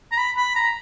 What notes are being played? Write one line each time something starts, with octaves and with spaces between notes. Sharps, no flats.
A#5
B5
B5
A#5